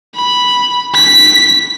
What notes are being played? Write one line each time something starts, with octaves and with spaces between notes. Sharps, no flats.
B5
B6